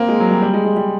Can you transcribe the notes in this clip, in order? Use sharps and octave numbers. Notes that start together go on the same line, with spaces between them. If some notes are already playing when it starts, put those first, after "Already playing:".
Already playing: A#3 C4
G#3
F#3
G3
G3
G#3
G#3
G3